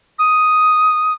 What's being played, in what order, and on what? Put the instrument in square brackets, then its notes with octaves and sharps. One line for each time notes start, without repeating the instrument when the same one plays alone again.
[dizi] D#6